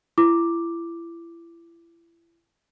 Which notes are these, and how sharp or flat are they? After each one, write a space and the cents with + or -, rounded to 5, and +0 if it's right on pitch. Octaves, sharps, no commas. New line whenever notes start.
E4 +35 D6 +0